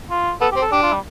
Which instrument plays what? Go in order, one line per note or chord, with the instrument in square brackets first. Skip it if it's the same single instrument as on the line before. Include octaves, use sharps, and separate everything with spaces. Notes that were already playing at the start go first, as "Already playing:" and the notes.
[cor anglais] F4
[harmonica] B3 [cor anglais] A4
[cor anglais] G4
[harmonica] C4
[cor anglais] A4
[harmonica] D4 [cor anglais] G4
[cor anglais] F4
G3